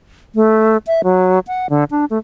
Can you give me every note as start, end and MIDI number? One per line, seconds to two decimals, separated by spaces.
0.35 0.77 57
0.87 1.01 76
1.04 1.39 54
1.47 1.67 78
1.70 1.84 50
1.91 2.05 62
2.10 2.18 57